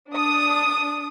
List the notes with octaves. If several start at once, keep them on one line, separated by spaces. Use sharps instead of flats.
D4 D#6